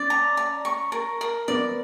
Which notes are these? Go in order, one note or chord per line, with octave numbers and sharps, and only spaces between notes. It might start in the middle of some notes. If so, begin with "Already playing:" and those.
Already playing: C#4 D5
A#5
A#5
C#6
A#4
A#4
B3 D5